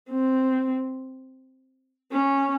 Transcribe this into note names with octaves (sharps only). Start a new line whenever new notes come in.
C4
C#4